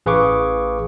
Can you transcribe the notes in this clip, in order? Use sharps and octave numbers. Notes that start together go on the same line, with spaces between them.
A1 G#4 B4 F5 C#6 D6